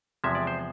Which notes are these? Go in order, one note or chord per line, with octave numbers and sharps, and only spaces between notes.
E2 C3 F3 G#3 E5
D5
C5